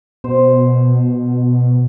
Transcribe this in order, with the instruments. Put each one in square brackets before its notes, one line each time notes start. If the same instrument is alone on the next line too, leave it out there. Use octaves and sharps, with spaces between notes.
[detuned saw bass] B2 [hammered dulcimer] C5